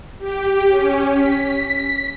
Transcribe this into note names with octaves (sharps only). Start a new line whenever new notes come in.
G4
C#4
B6